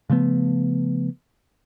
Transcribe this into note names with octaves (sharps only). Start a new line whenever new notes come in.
C#3 F3 A3 B3